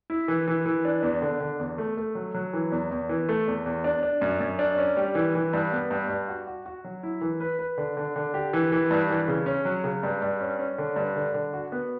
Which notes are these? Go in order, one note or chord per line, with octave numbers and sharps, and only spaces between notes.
E4
E3
E3
E3
D4
E2
D3
D3
E2
A3
A3
F#3
F#3
E3
E2
E2
E3
A3
E2
E2
D4
D4
F#2
F#2
D4
C#4
G3
E3
E3
G2
B3
G2
G2
F#4
F#4
F#4
F#3
E4
E3
B4
B4
D3
D3
D3
G4
E3
E3
G2
E3
C#3
C#4
F#3
C#3
G2
G2
C#4
C#4
D3
G2
D3
D3
F#4
B3